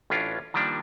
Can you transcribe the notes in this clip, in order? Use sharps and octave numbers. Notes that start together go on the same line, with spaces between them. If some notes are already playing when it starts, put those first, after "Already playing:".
A1 A2 C#4 D4 F4
D#3 F3 G3 A#3 D4